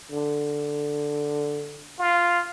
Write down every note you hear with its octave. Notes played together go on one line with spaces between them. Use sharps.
D3
F4